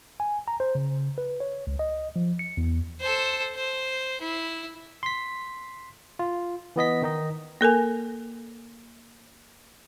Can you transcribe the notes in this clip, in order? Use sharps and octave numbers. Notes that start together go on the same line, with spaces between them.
G#5
A#5
C5
C#3
B4
C#5
C#2
D#5
F3
C#7
E2
A4 C5
C5
E4
C6 B6
F4
E3 B3 D#5 B6
D#3 D#4 D#5
A#3 A4 A#4 G#5